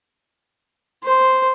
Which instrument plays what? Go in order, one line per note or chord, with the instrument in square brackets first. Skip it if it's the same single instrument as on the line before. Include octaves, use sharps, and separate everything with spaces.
[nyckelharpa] C5